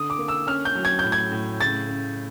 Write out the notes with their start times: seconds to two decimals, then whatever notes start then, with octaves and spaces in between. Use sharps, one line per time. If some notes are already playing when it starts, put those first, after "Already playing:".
Already playing: D3 D#6
0.10 D6
0.19 A#3
0.28 E6
0.47 C#4 F6
0.65 G6
0.75 F#3
0.85 G#6
0.99 A2 G6
1.12 G#6
1.32 A2
1.60 C#3 A6
1.89 C#3